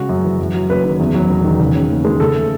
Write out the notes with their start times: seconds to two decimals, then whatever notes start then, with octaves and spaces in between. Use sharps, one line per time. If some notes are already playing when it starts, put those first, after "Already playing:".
Already playing: C#3 G#3 F#4
0.09 F#2
0.24 E3
0.39 F#2
0.55 F#3
0.70 F#1 B4
0.84 D#3
1.00 E2
1.14 F#3
1.29 E1
1.44 D#3
1.59 C#3
1.75 C#4
1.90 D#2
2.05 G#3
2.20 C#3 A4
2.35 A3